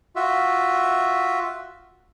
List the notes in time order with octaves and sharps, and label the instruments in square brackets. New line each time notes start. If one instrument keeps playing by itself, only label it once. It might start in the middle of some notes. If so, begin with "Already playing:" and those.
[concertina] F4 F#4 E5